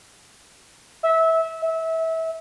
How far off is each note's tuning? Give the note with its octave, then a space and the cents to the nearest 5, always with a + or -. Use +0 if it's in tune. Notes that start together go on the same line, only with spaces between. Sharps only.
E5 -20
E5 -25